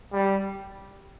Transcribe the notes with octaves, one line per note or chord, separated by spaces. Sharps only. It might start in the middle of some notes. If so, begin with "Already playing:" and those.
G3